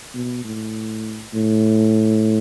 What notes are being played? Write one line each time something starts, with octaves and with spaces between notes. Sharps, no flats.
B2
A2
A2